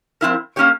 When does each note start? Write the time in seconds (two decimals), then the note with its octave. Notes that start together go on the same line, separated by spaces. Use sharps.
0.21 F3 C4 E4 A#4
0.56 A#3 C#4 G4 C#5